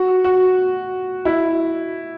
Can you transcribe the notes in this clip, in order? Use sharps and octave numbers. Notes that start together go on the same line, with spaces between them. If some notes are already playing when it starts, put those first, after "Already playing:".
Already playing: F#4
F#4
E4